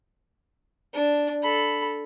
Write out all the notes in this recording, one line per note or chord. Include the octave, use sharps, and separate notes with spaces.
D4
A4 B5